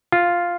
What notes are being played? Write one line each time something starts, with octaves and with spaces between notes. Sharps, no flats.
F4